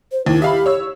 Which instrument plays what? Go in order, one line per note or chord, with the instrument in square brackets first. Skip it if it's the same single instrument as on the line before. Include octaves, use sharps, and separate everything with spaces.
[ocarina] C5
[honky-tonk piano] D#2 [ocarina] E4
[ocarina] G4 [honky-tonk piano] E5 F5 B5
[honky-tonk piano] C#5 E6